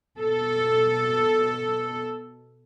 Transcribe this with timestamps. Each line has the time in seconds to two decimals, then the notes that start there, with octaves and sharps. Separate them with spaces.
0.18 B2 A4